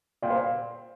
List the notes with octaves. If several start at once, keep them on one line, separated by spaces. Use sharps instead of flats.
A#2 D5 G5
C5 F5